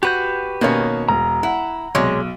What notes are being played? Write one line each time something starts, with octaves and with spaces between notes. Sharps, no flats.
F#4 G4 B4 G6
B2 D#3 A#3 C#4 C#5
E1 A#5
E4 F#5
B1 C3 G#3 C#5